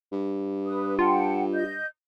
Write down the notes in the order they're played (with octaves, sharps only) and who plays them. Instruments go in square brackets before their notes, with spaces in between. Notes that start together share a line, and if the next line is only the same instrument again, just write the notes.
[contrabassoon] G2
[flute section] B4 D#6
[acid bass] F4 [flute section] F#5 G5 A5
[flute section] D#5 G6